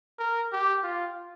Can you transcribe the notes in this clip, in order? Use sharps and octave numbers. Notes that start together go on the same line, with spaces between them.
A#4
G4
F4